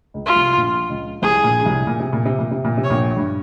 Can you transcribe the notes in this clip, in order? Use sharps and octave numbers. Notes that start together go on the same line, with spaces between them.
C#2 C#3
F4
C2 C3
A#1 A#2
C#2 C#3
C2 C3 G#4
A#1 A#2
C#3
C2 C3
A#2
C3
A#2
C3
A#2
C3
A#2
C3
C#5
A#1 A#2
G2